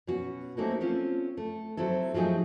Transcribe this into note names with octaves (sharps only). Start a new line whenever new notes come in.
B2 C#4 F#4
A3 A#3 C4 C#4 D#4 F#4
C4 C#4 F4 A4
A3
F#3 C4 E4 A4
F3 F#3 A3 D#4 G#4